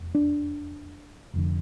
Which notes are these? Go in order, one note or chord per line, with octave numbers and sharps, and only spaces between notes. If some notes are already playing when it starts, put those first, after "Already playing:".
Already playing: F1 E2
D4
F1 F2 D3